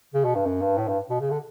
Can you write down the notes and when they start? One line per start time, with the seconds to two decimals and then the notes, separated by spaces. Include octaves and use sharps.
0.14 C#3
0.24 B2
0.35 G2
0.46 F#2
0.62 G2
0.78 A2
0.88 G2
1.10 B2
1.21 C#3
1.30 D3